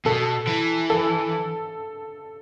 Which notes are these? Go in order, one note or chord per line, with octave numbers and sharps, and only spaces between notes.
B2 A4
E3
A4